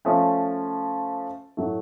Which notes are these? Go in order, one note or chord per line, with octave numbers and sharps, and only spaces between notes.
F3 A3 C#4
A2 F#3 A3